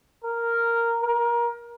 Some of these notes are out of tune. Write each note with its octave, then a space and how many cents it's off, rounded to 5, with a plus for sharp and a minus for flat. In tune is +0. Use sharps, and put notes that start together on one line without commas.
A#4 -5
A#4 +25